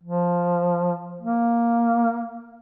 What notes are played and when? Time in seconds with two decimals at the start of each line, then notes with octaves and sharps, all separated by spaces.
0.04 F3
1.21 A#3